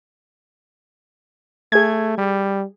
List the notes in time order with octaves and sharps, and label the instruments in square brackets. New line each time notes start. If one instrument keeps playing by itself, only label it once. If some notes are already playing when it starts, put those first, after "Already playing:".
[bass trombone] A3 [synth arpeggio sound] G#4 G#6
[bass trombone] G3